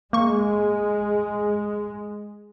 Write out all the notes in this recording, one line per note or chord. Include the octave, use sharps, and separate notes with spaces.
G#3 A#3 C#6